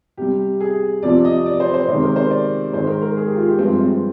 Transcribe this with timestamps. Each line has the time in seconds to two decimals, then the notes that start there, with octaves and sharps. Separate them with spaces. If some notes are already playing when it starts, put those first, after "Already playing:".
0.17 C3 G3 G4
0.60 G#4
1.03 F2 C3 F3 D5
1.25 D#5
1.46 D5
1.60 C5
1.74 C5
1.88 C3 D#3 G#3 C5
2.02 A#4
2.16 C5
2.31 D5
2.73 G#2 D#3 G#3 C5
2.87 A#4
3.02 A#4
3.16 G#4
3.27 G4
3.37 F4
3.48 G4
3.58 G2 F3 G#3 C4
3.81 C4